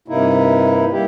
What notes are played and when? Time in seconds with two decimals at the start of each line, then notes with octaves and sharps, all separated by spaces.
0.08 G2 C3 A#3 D#4 E4
0.91 G3 A#3 E4 G4